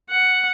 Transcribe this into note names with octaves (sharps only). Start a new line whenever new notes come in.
F#5